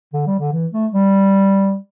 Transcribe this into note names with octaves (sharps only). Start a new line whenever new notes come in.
D3
G3
D3
E3
A3
G3